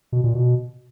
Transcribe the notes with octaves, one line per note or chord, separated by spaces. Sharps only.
B2
A#2
B2